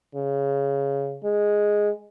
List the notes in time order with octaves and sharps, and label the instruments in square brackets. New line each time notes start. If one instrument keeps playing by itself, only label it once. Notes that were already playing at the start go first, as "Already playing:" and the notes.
[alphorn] C#3
G#3